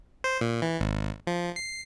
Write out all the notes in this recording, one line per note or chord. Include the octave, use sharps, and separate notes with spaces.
C5
A#2
E3
G#1
F3
C7